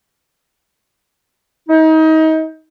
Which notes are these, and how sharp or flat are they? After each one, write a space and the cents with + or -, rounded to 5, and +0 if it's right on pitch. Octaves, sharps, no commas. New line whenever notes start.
D#4 +30